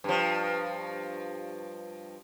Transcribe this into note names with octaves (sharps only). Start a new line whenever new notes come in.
G2 F3